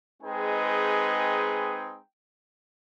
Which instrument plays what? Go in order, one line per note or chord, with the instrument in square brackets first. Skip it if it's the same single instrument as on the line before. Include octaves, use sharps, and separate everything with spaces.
[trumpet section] G#3 C4 D#4 G#4 B4 G5